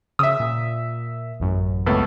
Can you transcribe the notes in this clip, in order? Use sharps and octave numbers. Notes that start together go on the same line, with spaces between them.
C#3 E5 D#6
A#2
A1 F#2
C#2 A3 B3